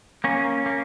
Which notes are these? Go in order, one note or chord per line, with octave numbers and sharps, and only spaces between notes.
A#3 C#4
A#3